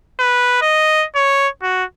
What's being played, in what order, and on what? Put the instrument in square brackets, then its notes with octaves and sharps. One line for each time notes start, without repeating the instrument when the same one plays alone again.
[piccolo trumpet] B4
D#5
C#5
F#4